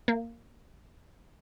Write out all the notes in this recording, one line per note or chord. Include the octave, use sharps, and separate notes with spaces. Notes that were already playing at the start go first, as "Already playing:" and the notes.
A#3